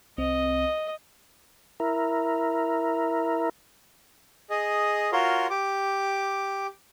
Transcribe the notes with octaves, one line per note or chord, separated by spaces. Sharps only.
C2 C4 D#5
E4 A#4
G#4 D#5
F4 F#4 A#4 C#5 C6
G4 D6